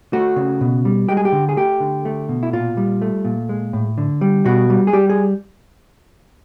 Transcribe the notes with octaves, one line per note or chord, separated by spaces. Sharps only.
A3 F#4
C#3
B2
G3
G#3 G4
G#4
G4
D3
G#4
A3 G4
D3
A3
B2
E4
A#2 F4
G3
A3
A#2
G#3
A2
D3
G3
B2 F#4
G3
G#4
G3 G4
G#4